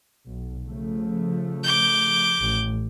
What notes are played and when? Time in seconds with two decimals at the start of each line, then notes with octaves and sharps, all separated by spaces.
0.27 B1
0.65 C#3 F3 A3
1.64 D6 G6
2.40 A1